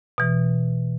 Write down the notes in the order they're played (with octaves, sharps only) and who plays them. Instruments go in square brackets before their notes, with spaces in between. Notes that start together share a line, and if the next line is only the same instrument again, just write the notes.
[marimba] B2 E3